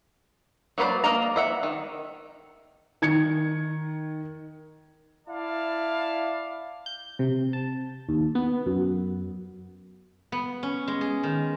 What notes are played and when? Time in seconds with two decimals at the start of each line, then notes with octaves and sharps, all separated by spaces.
0.78 F#3 A#3 B4 C5 D5
1.04 A#3 A#4 D#5 A#5
1.36 C5 E5 F#5
1.63 D#3
3.02 D#3 G#6 C#7
5.27 E4 D5 F5 A5
6.86 G6
7.19 C3
7.53 A5
8.09 D#2
8.35 B3
8.66 F#2
10.32 B3
10.63 C#4
10.87 G#3
11.01 G#4
11.23 D#3